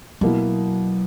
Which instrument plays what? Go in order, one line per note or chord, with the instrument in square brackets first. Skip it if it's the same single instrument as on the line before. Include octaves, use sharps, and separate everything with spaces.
[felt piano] B2 A#3 E4 [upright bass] F#3